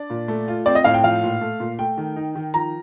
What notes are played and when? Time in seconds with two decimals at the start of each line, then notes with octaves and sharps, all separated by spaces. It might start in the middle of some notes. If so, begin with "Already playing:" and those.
Already playing: D4 D5
0.10 A#2
0.28 A3
0.48 F4
0.66 C4 D5
0.75 D#5
0.84 A2 F5
0.94 G5
1.03 F3 F5
1.23 A#2
1.41 A3
1.60 A#2
1.79 A3 G5
1.97 D#3
2.16 D#4
2.35 D#3
2.54 F3 A#5